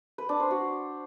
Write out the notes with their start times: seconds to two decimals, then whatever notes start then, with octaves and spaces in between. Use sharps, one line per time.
0.18 B4
0.29 D4
0.40 C5
0.51 F#4